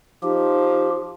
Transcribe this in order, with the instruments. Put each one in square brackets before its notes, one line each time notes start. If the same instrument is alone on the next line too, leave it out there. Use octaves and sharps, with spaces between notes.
[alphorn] F3 [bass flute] D#4 [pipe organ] G4